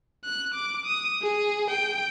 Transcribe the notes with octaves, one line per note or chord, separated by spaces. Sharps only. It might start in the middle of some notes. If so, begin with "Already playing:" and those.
F#6
D6
D#6
G#4
G5